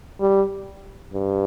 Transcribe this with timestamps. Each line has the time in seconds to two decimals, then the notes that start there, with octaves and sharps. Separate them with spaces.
0.21 G3
1.13 G2